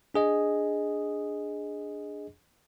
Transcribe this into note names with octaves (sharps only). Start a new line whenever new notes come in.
D4 G#4 D#5